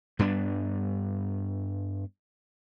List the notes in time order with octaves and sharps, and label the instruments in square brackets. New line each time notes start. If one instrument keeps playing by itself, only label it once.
[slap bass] G2 G3 B3 D4